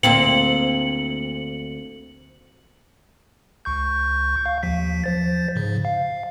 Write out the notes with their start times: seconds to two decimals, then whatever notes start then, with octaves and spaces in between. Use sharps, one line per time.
0.03 D2 A#3 C4 C#7 F#7
3.65 C#2 C#6 G6
4.46 F5
4.63 D#2 F3 B6
5.04 F3 C5 A6
5.56 G#2 C#3
5.85 F5